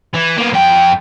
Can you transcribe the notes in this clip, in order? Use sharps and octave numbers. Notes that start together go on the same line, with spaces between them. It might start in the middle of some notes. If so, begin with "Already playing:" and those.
E3
A#3 B3
F2 G5